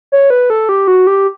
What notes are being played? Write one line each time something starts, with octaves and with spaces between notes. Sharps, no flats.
C#5
B4
A4
G4
F#4
G4